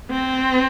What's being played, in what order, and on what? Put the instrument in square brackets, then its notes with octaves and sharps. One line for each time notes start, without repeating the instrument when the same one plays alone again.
[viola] C4